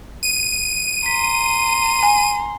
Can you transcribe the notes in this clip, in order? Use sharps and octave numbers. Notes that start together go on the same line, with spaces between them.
D#7
A#5 C6 B6
G#5